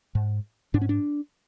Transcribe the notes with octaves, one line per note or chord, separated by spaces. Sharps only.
G#2
G#2 D4
C#4
D4